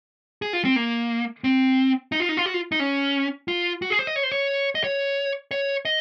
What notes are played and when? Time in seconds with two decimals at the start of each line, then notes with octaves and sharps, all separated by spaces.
0.42 G#4
0.53 F4
0.65 C4
0.76 A#3
1.44 C4
2.12 D#4
2.20 F4
2.29 D#4
2.37 F4
2.46 F#4
2.54 F4
2.72 D#4
2.80 C#4
3.48 F4
3.82 F#4
3.90 G#4
3.99 C5
4.07 D#5
4.16 C#5
4.23 C5
4.31 C#5
4.75 D#5
4.84 C#5
5.51 C#5
5.85 D#5